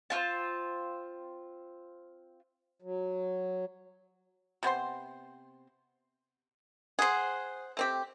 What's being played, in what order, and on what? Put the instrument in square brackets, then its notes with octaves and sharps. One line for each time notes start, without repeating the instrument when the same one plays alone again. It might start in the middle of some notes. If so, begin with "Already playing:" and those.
[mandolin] C4 F4 A5
[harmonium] F#3
[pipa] C3 B3 C5 C6
[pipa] G#4 [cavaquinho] C5 F#5
[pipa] A3 C4 G4